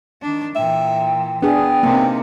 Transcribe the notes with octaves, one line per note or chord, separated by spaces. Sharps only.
D#3 D4
A#2 E3 E5 G5
B3 D4 G#4 G5
C3 A#3 D#4